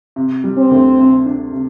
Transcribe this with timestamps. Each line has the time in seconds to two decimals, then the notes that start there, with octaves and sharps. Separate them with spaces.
0.16 C3
0.44 G3
0.58 C4
0.71 D2
0.99 C3
1.26 D4
1.53 C3